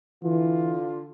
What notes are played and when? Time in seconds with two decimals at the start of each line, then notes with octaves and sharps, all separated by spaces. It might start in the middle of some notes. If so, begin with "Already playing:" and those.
0.23 D3 E3 F4